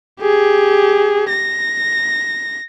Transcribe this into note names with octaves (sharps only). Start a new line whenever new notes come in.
G4 G#4
A#6